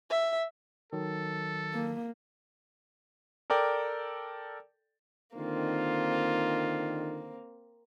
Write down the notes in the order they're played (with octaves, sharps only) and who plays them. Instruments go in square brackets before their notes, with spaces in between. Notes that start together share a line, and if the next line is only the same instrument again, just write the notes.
[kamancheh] E5
[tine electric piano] D#3 F#3 [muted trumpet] A4
[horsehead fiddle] A#3
[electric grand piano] A4 A#4 D5 G5
[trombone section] D3 D#3 [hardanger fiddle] A#3 C4 [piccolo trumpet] F4